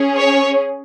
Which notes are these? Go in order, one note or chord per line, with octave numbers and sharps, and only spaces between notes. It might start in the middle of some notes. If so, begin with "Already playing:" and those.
Already playing: C#4 G#4
C#5